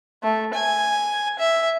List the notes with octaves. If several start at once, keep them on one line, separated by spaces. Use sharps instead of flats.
A3
G#5
E5